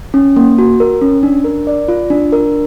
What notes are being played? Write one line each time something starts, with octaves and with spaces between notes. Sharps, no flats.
C#4
A#3
F#4
A#4
C#4
D4
A#4
D5
F4
D4
A#4